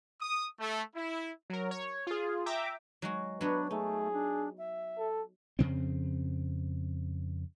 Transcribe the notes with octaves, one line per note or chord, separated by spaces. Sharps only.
D#6
A3
E4
F#3 A#4
C#5
F4 G#4
E5 G5 A#5 D6
F#3 G#3 F#4
F#3 B3 D4 B4 C#5
A3 D#4 G#4
D4
E5
A4
F2 C#3 C4